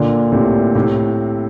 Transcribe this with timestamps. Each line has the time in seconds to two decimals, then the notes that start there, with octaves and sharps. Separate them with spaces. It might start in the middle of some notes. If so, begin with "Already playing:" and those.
Already playing: A#2 D3
0.32 A2 C3
0.75 A2 C3